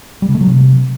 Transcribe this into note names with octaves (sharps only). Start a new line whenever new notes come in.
G3
C#3
A3
F#3
C3